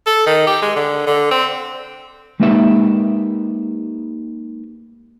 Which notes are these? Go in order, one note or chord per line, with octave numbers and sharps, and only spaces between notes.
A4
D#3
G4
G#3
D3
D3
C4
G#3 A#3 D#4 G4 B4 E5